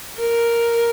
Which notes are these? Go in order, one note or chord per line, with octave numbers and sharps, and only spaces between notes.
A#4